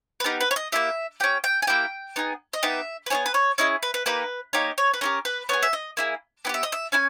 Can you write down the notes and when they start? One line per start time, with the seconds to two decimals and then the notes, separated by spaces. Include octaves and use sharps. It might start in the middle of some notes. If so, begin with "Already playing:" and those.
0.20 B4
0.24 B3 D#4 G4 A#4
0.41 B4
0.51 C#5
0.56 D#5
0.72 A#3 C#4 E4 G4 E5
1.20 C#4 G4 G5
1.44 G5
1.62 G#5
1.67 A#3 E4 G4 G5
2.16 B3 D#4 G#4
2.53 D#5
2.63 B3 D#4 G4 E5
3.06 B4
3.10 B3 E4 G#4 C#5
3.26 B4
3.34 C#5
3.58 C#4 E4 G#4 D#5
3.83 B4
3.94 B4
4.06 A#3 D#4 G4 B4
4.53 A#3 D#4 G4 C#5
4.78 C#5
4.94 B4
5.01 C#4 E4 G4 A#4
5.25 B4
5.49 B3 D#4 G#4 C#5
5.63 E5
5.73 D#5
5.97 A#3 E4 G#4
6.45 B3 E4 G5
6.49 G4 E5
6.63 D#5
6.72 E5
6.92 C#4 E4 G#5